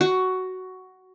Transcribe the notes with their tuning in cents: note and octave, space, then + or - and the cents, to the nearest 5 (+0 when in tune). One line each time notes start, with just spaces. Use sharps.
F#4 +10